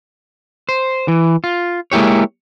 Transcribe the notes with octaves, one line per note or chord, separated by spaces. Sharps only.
C5
E3
F4
G#3 A#3 E4 G4 C#5